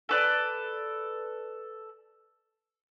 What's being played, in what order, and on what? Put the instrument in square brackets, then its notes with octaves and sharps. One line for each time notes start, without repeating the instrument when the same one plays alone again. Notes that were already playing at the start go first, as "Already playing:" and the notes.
[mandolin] A4 B4 D5